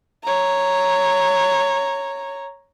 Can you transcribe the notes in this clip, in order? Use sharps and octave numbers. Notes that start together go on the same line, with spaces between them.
C#5 A#5